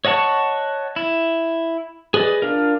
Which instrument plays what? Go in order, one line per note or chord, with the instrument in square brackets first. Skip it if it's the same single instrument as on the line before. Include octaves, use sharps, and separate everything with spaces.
[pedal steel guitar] C#5 D#5 F#5 A5 C#6
E4
G#4 B4 D5 D#5
D4 F4 A#4